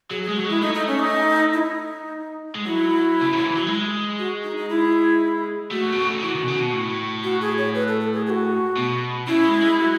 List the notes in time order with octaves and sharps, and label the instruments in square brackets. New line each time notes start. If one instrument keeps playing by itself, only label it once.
[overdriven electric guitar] F#3 [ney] G#4
[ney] G#4
[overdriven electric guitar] G#3
[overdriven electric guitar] F#3 [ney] F#4
[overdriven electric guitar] G#3 [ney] E4
[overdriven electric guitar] A3 [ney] D#4
[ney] D#4
C#4
D#4
E4
D#4
[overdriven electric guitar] G#3
[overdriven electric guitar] F#3 [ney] E4
[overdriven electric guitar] C#3
D#3
E3
F#3
G#3
[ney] F#4
D#4
D#4
E4
[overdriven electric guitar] A3 [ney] F#4
[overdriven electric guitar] A2
B2
C#3
D#3
[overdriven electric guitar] E3 [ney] F#4
[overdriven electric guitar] D#3
B2
C#3
B2
A2
[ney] F#4
G#4
C#5
B4
A4
A4
G#4
G#4
F#4
[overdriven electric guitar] B2
[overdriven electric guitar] C#3 [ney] E4
[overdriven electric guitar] G#3
G#3
F#3